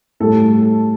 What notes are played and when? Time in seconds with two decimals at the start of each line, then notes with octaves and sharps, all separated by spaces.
0.20 A2 G3 A4